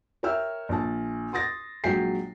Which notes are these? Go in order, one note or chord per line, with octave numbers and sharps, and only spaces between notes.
A#4 C#5 E5 G5 E6 F6
A#1 A5
C6 D#6 A6 A#6
A#1 F#3 G#3 G5 B6 C7